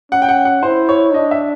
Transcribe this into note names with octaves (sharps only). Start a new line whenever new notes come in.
C#4 F#5
G5
F#5
F#5
E4 C5
C#5
D4 D#5
E5